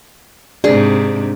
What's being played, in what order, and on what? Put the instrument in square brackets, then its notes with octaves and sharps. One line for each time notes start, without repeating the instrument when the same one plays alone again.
[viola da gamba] G#2 C3 [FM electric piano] D4 [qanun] G#4